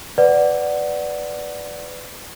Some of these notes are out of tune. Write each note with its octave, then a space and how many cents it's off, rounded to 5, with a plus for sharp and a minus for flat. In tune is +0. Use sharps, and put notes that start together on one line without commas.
B4 +20 D5 +0 F#5 +0